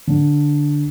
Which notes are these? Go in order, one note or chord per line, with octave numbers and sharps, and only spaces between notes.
D3